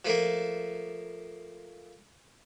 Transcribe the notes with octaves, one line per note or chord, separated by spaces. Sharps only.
F3 A3 A#3